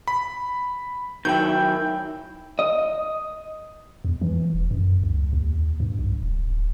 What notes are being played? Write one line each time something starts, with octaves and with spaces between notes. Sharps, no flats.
B5
D#3 F#3 E4 G5 G6
D#5
E2
E3
E1
F#2
C#2
D#2
G2
B1
D1